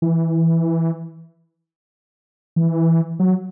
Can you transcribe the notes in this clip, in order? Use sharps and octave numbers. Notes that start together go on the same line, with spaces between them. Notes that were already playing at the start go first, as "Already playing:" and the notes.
E3
E3
F#3